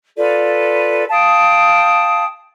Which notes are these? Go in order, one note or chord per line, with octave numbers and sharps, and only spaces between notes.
F4 A4 B4 D5
F5 G5 A5 D#6